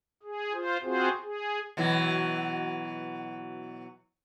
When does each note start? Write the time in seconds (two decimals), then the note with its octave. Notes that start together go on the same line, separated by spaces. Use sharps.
0.23 G#4
0.53 F4 C5
0.83 C4 F4 F#4 G#4 C5
1.23 G#4
1.77 B2 E3 F#3